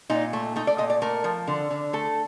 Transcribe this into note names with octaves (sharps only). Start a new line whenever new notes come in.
A#2 D#4
A3
A3 D#4
D5
A#2 D#5
D5
A3 A#4
F3
D3
D3
A3 A4